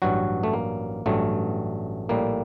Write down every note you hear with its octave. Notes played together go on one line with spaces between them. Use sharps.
A1 G2 F#3 F#4
A3
A#3
A1 G2 F#3 A3
A#1 A2 G3 A#3